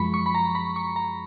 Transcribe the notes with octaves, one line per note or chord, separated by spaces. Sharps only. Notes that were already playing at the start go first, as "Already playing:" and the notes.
Already playing: F#2 F3 G#3 B5 C#6
C#6
B5
A#5
B5
C#6
A#5